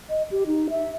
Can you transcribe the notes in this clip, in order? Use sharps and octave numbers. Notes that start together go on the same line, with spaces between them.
D#5
G4
D#4
E5